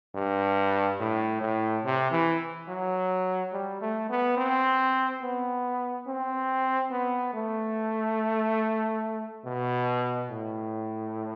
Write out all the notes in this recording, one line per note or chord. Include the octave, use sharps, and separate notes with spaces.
G2
A2
A2
C3
E3
F#3
G3
A3
B3
C4
B3
C4
B3
A3
B2
A2